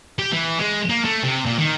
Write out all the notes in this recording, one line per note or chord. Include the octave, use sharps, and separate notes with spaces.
G4
E3
G#3
A#3
A3
C3
A#2
D#3